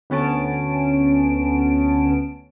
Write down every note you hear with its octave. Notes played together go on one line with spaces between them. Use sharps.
D2 B3 C#4 A5 D7